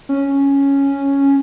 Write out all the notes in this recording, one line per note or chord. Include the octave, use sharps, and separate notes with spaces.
C#4